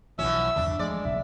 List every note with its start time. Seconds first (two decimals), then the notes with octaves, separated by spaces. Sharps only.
0.19 B1 B2 E3 F3 C#4 E5 E6
0.56 E2 G2 D3 D4
0.79 F3 G#3 A3 D5
1.05 F#1 B1 E5